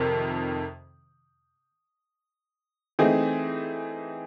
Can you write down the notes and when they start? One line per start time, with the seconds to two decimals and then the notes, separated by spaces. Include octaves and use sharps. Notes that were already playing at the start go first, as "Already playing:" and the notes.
Already playing: F2 C3 D#3
2.99 E3 A3 C4 D#4 G#4